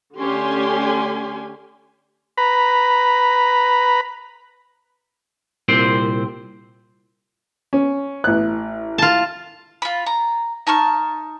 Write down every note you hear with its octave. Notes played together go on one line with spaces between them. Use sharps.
D3 A3 C#4 G4 G#5 C6
B4 A#5 B5
C2 A#2 C4 C5 G5
C#4
A1 F#6
F4 A5
F4 B5
A#5
D#4 A5 C#6 F6